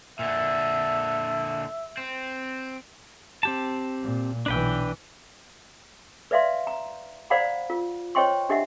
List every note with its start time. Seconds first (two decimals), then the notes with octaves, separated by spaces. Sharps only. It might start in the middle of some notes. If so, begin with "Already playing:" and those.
0.19 A#2 D3 E5
1.97 C4
3.43 C4 G4 A5
4.03 A#2
4.46 B1 E3 D4 B4 G5
6.31 B4 D5 E5 F5 C6
6.67 A#5
7.30 C5 D5 F5 F#5 A#5 B5
7.70 F4
8.15 C5 C#5 D#5 G5 C6 C#6
8.49 D4 G4 D#5 E5 F#5